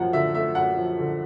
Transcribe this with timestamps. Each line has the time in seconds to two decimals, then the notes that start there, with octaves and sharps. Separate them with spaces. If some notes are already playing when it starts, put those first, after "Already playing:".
Already playing: F#2 F3 F#5
0.13 D3 E5
0.34 A3 E5
0.55 F#2 F#5
0.77 F3
0.99 D3